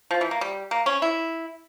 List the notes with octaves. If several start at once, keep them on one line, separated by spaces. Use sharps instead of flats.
F3
E3
A#3
G3
A#3
C#4
E4